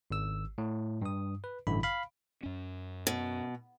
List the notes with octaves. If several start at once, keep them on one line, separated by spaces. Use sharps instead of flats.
G#1 E6
A2
G2 D#6
B4
A1 G2 D3 E4 B5
F5 B5
F#2 C#4
B2